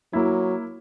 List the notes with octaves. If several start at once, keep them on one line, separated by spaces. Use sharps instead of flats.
F#3 A#3 E4